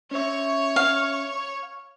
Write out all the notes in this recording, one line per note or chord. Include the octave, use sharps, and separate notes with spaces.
C#4 C#5 E5 C#6
F5